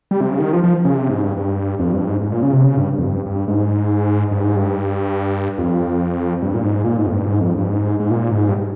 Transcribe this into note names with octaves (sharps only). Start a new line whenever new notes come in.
G3
C3
C#3
D#3
F3
F3
C#3
C3
G#2
G2
G2
F2
G2
G#2
G#2
A#2
C#3
C3
C#3
G2
F2
G2
G2
G#2
G2
G#2
G2
F2
G2
A#2
G#2
A#2
G#2
F2
G2
G#2
F2
G2
G#2
G#2
A#2
G#2
G2